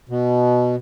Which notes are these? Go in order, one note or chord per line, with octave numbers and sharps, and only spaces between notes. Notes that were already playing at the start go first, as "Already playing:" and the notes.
B2